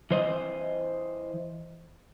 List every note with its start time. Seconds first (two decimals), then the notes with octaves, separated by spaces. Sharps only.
0.11 E3 C5 D#5